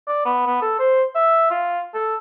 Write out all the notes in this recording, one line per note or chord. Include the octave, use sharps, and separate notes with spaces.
D5
B3
B3
A4
C5
E5
F4
A4